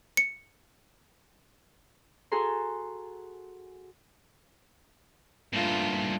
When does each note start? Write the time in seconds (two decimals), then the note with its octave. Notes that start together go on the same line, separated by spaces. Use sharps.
0.17 C#7
2.32 F#4 G#4 A4 G#5 A#5 C6
5.53 G2 A#2 A3 F4